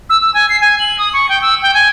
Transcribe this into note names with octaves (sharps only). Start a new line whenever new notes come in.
E6
E6
G#5
C7
G#5
F#7
D#6
C#6
G5
E6
G5
G#5